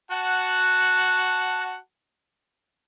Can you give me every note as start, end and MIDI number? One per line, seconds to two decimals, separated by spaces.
0.11 1.77 66
0.11 1.77 78
0.11 1.77 81